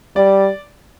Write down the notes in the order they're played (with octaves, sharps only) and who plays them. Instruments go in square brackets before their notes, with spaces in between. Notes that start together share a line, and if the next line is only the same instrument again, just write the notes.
[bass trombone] G3 [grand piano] D5